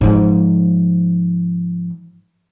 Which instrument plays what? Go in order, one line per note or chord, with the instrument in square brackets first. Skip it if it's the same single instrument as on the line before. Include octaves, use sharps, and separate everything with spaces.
[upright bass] G#2 F3